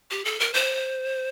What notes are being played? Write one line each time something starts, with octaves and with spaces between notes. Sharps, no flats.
G4
A4
A#4
C5